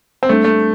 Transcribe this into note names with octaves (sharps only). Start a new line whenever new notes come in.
C4
G3 A3 D4 A4
A3